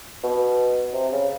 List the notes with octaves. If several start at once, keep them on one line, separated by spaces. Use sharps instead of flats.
B2
C3
C#3